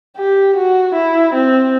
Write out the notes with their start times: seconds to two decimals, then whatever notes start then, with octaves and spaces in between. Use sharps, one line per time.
0.18 G4
0.56 F#4
0.95 E4
1.34 C4